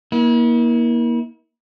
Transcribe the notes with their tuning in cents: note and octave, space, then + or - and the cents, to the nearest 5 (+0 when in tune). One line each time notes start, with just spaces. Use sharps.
A#3 +25 E4 -40